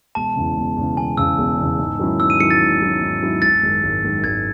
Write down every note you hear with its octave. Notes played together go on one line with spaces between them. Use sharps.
E1 A5
E2 C#3
E1
E2 C#3
E1 G#5
E2 C#3 E6
E1
E2 C#3
G#2
D#3 F#3 C#4 E4
G#2 E6
D#7
D#3 F#3 C#4 E4 C#7
A6
G#2
D#3 F#3 C#4 E4
G#2
D#3 F#3 C#4 E4
G#1 A6
F#2 D#3 G#3
G#1
F#2 D#3 G#3
G#1 G#6